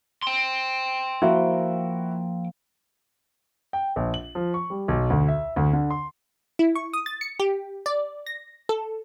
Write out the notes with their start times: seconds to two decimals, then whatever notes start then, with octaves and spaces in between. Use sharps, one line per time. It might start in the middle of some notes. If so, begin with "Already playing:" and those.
0.23 G5 C6
1.22 F3 A#3 E4 F#4
3.73 G5
3.96 A#1
4.14 F#7
4.35 F3
4.54 C#6
4.70 G3
4.88 B1
5.10 D2
5.28 E5
5.56 D2
5.73 D3
5.91 C6
6.59 E4
6.75 C#6
6.93 D#6
7.06 A6
7.21 C#7
7.39 G4
7.86 D5
8.26 A#6
8.69 A4